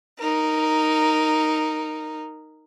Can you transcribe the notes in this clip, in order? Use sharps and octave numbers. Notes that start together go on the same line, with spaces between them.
D#4 A#4